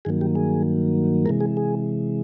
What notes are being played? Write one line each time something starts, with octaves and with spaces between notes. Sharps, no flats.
G2 D#3 F#3 A#3 G#4
G4
G#4
C3 E3 G#3 A#4
G#4
G#4